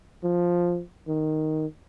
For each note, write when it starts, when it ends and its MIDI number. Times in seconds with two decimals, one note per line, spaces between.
0.24 0.82 53
1.08 1.66 51